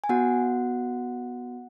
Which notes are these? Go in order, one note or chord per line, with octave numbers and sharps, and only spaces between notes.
G#5
B3 F#4 F#5